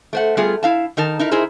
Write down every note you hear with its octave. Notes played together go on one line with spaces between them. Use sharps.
A3 C5 F#5
G3 A3 B3 F4 G#4
E4 F5 A5
D#3 D#4 A#4 A5
D#4 E4 A#4
D#4 E4 G#4 A#4 C5